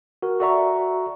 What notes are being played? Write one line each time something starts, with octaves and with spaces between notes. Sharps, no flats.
F#4 A#4
F#4 A4 D5 E5 A#5 C#6